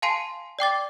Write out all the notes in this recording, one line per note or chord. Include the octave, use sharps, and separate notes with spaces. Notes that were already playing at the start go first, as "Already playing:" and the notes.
F5 G#5 A5 C6 C7 D#7
D5 G5 D6 A6